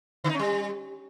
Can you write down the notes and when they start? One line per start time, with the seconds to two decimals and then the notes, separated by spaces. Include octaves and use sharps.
0.24 D3
0.29 D#4
0.34 C#4
0.39 G3